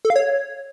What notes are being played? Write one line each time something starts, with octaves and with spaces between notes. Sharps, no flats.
A4
F5
C#5